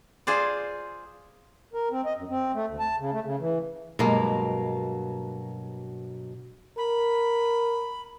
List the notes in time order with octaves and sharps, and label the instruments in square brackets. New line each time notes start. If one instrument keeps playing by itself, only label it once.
[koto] F4 G#4 C5 D5
[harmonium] A#4
C4
D#5
F#2
C4
A3
D2
A5
C#3
A3
C#3
E3
[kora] G2 A#3 [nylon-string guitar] B2 F#3 G#3
[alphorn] A#4 [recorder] B5